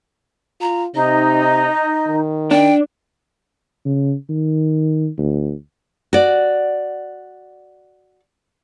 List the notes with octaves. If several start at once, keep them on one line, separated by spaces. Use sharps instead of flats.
F4 A#5
C3 D#4 D#5
D#3
D4 G5
C#3
D#3
D2
F#4 D5